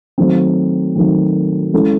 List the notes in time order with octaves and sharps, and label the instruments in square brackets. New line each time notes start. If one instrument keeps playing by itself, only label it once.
[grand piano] D#3 F#3 A3 C4
D#3 F#3 A3 C4
G#3 C#4 E4 A4